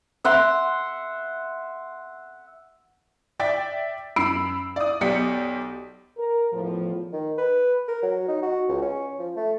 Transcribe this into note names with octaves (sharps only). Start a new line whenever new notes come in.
E5 F#5 C6
D5 E5 G5 A6 B6
F#2 B5 E6 C7 D7
D5 D#6
B1 G4 D5 B6 C#7
A#4
E2 A2 F3
D#3
B4
A#4
F#3
D#4
F#4
C#2
C#4
F3
A3